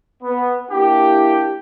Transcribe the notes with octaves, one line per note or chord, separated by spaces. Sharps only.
B3
A#3 D4 E4 G4